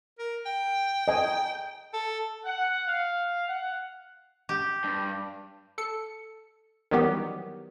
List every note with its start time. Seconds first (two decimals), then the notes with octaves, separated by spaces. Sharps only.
0.19 A#4
0.46 G5
1.08 D#5 G#5
1.93 A4
2.45 F#5
2.87 F5
3.47 F#5
4.49 G4
4.84 G2
5.78 A4 C#7
6.91 D#3 E3 F#3 G3 B3 G4